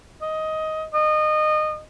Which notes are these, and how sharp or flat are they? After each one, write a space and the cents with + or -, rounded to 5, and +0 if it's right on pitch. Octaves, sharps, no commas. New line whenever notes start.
D#5 +15
D#5 -25